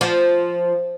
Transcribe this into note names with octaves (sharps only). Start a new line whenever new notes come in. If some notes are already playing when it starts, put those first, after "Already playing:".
F3